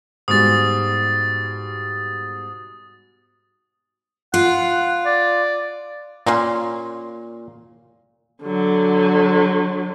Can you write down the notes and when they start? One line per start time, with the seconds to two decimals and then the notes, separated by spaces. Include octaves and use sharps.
0.28 G#2 B2 G3 D#6 A6
4.34 F4 F#5
5.06 D5
6.26 A#2 A#3 C#4 C6
8.43 D3 F#3